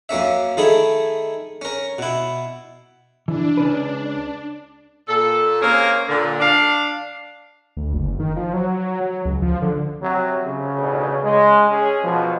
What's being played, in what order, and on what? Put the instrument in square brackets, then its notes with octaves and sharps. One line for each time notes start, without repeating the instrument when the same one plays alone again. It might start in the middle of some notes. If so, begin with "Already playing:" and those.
[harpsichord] F#2 A#3 C#4 E5
D#3 A3 D#4 E4 G#4
C#4 A#4
B2 E4
[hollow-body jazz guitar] E3 E4 [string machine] D4
[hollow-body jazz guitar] C#2 C#4 B4
[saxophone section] A#2 A4
A#3 C4 C#4 G#4 A#4
A#2 D3
D4 F5
[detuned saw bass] D2
F#1
D#3
F3
F#3
F#3
C#2
F3
D3
[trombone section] C3 [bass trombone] F#3
[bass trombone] C#3
[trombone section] A1 D2 B2
G#3
C#4 G#4
[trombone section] B2 [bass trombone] F3